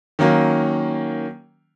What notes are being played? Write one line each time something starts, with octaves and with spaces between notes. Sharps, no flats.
D#3 F#3 A#3 C#4